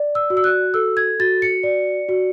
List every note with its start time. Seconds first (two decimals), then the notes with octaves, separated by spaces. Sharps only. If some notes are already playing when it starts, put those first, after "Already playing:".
Already playing: D5
0.15 E6
0.30 F#4
0.37 E6
0.44 F#6
0.74 A4 E6
0.97 G#6
1.20 F#4 A6
1.42 C#7
1.63 D5
2.09 F#4